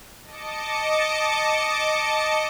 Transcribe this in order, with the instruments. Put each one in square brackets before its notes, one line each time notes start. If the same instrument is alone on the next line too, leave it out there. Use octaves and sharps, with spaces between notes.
[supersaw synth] D#5 A5 D6 C#7